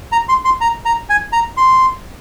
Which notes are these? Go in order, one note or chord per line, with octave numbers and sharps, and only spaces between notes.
A#5
C6
C6
A#5
A#5
G#5
A#5
C6